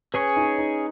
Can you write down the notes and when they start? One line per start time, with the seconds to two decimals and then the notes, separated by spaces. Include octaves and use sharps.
0.14 C#4 G#4 B4 C#5
0.37 D#4
0.58 D#4